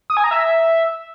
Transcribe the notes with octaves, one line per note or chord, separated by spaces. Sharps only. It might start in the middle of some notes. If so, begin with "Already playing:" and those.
D#6
G#5
A#5
E5